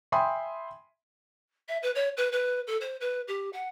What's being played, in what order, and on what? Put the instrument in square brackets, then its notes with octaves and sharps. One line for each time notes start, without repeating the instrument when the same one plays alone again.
[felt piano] E5 G5 G#5 B5 C6 D#6
[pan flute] E5
B4
C#5
B4
B4
A4
C5
B4
G4
F#5